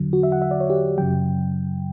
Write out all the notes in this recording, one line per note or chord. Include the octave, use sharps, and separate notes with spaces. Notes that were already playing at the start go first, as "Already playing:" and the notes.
Already playing: E2 D3 F#3
F#4
E5
F#5
E5
D5
C#5
G4
F#2 C#3 F#3 G5